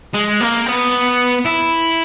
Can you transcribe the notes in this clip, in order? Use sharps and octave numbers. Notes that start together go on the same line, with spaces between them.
G#3
A#3
B3
E4